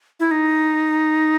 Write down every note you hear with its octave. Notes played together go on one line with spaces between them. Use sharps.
E4
D#4